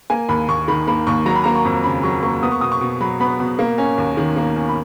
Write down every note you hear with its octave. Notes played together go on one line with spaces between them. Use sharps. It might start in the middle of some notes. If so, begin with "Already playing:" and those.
A#3 G#5
D#2 B5
D#2 C#6
D#3 B5
A#3 B5
D#2 C#6
F#3 A#5
B5
A#3 A#5
C#6
F2
C#3 B5
F#3 C#6
A#3 C#6
B3 D#6
C#6
B2 D#6
C#6
B2
F#3 B5
B3 B5
B2
A#3
C#4
D#2
D#3
A#3
C#4
B5